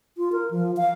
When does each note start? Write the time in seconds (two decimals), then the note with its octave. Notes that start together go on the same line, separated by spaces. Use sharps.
0.18 F4
0.32 A#4
0.51 F3
0.77 F5